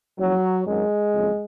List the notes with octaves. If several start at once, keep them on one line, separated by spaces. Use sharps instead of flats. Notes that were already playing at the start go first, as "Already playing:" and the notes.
F#1 F#2 C#3 F3 F#3
G#1 F#2 D#3 F#3 G#3
F#1 F2 C#3